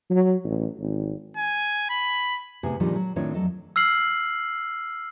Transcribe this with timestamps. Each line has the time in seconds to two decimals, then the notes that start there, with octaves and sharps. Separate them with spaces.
0.10 F#3
0.45 A1
0.79 G#1
1.37 G#5
1.90 B5
2.63 A2 C3 B3 G#4
2.80 A#2 D3 D#3 F3 G3 G#3
2.96 F#3
3.16 A2 D#3 C4 D4 F4 C#5
3.34 F2 F#3 A4 D#5
3.76 E6 F6 C7 F#7